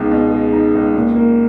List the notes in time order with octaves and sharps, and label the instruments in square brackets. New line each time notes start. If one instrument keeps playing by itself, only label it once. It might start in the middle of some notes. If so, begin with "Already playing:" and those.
Already playing: [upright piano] C#2 B2 G#3 D#4
B2
G#3
D#4
C#2
A#2
A#3